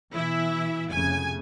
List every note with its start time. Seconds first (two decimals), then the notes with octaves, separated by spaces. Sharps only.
0.13 B2 E3 E4 E5
0.90 F1 C#3 A3 G#5